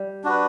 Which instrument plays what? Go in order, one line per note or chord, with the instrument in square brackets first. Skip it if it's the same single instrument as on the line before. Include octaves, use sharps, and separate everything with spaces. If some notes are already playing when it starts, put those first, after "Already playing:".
Already playing: [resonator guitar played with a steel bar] G3
[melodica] D4 F#4 B4